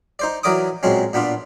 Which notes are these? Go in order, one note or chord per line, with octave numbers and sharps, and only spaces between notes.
D#4 C5 D5
E3 F#3 A#4 D5 D6 D#6
A#2 F#3 G#3 C4 C#4
A#2 B3 D4 F4